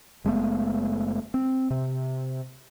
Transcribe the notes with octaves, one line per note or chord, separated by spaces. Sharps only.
F#1 G#3 A3 B3
C4
C3